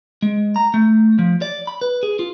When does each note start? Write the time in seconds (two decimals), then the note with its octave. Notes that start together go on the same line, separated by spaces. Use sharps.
0.22 G#3
0.56 A#5
0.74 A3
1.19 F3
1.42 D5
1.67 B5
1.81 B4
2.03 G#4
2.19 F4